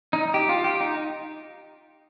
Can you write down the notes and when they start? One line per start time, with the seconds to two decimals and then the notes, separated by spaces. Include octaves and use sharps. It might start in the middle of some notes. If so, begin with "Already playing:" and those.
0.13 D#4
0.34 G4
0.49 F4
0.64 G4
0.80 D#4